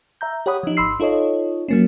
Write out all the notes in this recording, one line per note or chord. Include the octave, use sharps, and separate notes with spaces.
E5 A#5 G6
G4 C#5 F#5 B5 D#6
F3 D#4
G#1 B5 C6 E6 C7
D#4 F4 A4 C#5 D#5
F#3 A#3 C#4